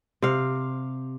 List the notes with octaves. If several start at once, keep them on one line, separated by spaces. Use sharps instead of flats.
C3 F5